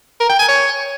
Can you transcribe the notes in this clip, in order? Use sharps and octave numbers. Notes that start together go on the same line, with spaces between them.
A#4
G5
G#5
C#5